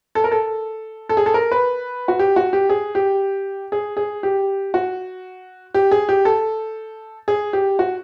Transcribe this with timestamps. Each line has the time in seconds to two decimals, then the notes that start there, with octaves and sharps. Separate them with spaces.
0.15 A4
0.24 A#4
0.32 A4
1.09 A4
1.17 G#4
1.26 A4
1.34 A#4
1.52 B4
2.08 F#4
2.19 G4
2.36 F#4
2.53 G4
2.70 G#4
2.95 G4
3.72 G#4
3.97 G#4
4.23 G4
4.74 F#4
5.74 G4
5.92 G#4
6.09 G4
6.25 A4
7.28 G#4
7.53 G4
7.79 F#4